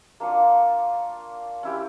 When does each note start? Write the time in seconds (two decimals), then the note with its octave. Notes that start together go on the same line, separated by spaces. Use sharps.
0.20 A#3 D4 F4 C#5
1.63 C#4 E4 G4